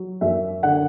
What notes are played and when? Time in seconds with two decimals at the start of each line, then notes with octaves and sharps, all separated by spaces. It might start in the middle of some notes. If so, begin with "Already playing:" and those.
Already playing: F#3
0.21 F#2 E5
0.62 D3 F#5